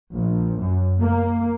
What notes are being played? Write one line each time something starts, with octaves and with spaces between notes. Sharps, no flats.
A#1
F#2
A#3